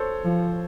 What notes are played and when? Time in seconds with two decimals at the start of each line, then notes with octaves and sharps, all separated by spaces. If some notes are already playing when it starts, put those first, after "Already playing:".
Already playing: A4 C5 C#5
0.24 F3